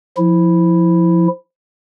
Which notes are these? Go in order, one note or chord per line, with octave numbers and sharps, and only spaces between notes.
F3 E4